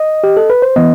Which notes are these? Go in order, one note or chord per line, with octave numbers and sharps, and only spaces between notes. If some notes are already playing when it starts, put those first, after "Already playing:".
Already playing: D#5
G4
A4
B4
C5
E3 B3 D#5